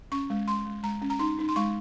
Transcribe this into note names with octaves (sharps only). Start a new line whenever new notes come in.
C#4 C#6
G#3
G#3 C6
G#3
G#3 A#5
C#4
A#5
D#4 C6
D#4
C6
G#3 C#6